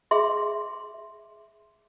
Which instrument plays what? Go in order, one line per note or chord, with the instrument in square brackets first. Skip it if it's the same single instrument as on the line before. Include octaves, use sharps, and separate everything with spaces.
[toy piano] G#4 E5 C6